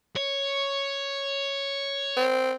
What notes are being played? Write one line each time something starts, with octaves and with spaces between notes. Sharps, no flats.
C#5
C4